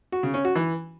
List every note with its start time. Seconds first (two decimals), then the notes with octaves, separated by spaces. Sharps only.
0.12 F#4
0.23 C#3
0.34 C#4
0.45 F#4
0.55 E3